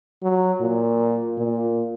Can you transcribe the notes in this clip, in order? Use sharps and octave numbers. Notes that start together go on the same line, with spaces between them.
F#3
A#2
A#2